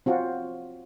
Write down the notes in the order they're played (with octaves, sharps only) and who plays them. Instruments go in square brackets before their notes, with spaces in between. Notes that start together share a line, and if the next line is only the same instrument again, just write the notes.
[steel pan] C4 F4 F#4